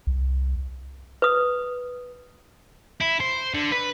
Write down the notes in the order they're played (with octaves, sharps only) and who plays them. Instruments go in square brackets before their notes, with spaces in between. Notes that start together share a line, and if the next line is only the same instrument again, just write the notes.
[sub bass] C2
[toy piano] B4 D#6
[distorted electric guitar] E4
C5
D3
B4